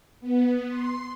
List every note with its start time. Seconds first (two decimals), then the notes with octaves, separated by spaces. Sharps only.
0.21 B3
0.69 C6